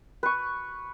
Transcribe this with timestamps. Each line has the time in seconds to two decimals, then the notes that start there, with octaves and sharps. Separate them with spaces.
0.23 B4 C#6